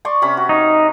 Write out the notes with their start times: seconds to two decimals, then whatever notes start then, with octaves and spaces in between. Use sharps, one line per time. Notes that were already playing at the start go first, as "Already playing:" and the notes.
0.05 D5 C6 C#6
0.22 C3 C#4 B5
0.37 F#4
0.49 D#4